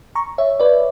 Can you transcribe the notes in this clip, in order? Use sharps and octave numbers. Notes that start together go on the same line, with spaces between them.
A#5 C#6
C#5 E5
B4 D5